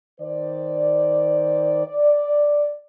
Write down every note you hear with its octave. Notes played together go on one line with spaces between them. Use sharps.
D#3 C5 D5
D5